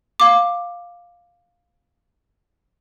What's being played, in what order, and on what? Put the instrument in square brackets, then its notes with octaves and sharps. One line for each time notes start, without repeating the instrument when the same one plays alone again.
[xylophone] F5 D6